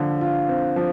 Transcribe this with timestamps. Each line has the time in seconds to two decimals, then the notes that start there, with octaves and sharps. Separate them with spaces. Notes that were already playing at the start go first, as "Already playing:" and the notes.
Already playing: D3 F3
0.21 F4
0.49 C4
0.76 F3